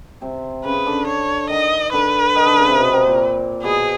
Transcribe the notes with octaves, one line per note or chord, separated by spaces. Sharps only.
C3 C4
C#3 C#4 B4
D3 D4
C#5
D#3 D#4 D#5
D3 D4 B4
D#3 D#4
D3 D4
C#3 C#4
C3 C4
B2 B3
C3 C4
A#2 A#3
B2 B3 G#4